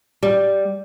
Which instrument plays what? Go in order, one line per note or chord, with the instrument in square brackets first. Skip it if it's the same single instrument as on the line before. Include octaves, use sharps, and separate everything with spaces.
[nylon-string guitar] G3